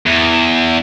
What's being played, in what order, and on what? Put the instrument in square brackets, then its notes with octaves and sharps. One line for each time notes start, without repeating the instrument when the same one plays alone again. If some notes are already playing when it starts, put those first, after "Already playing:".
[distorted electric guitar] E2